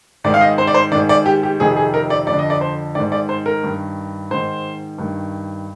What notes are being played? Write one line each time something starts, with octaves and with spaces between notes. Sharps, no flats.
G#2 D#3 D5
F5
D#5
C5
D5
C5
G#2 D#3 D5
D5
G4
G4
F2 C3 D#3 G#4
G#4
A#4
D5
F2 D5
D3
D#5
D5
C5
G#2 D#3 D5
D5
C5
A#4
G2 D#3
G#2 D#3 C5
G2 D#3